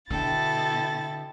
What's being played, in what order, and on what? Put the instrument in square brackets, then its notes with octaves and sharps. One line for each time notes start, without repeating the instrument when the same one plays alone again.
[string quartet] B2 E4 A6 [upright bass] D3 [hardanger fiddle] A4 G5